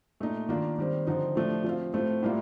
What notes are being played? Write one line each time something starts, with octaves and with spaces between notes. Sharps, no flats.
A#2 A3 D#4
D#3 A#3 D4 F4
D#3 G3 C4
D3 F3 C4 D#4
A2 F3 A3 D4
F3 C4 F4
A2 A3 C4 F4
A2 G3 A#3 F4